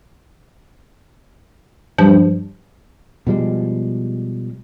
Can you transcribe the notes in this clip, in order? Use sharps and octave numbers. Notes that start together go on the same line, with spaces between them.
G2 F3
B2 F3 G3 G#3